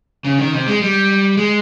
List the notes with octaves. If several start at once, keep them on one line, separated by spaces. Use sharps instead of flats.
C#3
D#3
C3
G#3
G3
G#3